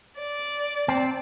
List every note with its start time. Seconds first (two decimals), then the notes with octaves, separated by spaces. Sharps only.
0.19 D5
0.88 C4